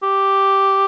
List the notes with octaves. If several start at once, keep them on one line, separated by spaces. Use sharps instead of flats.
G4